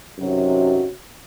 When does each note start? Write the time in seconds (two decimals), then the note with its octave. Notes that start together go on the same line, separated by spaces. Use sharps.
0.19 F#2 C3 D#3 F#3